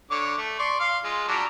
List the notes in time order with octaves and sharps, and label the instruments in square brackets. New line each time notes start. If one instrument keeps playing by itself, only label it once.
[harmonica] D3 C#5 D6
A3
D5 C6 C#6
F5 C6
G#3 F4
F#3 G3 D4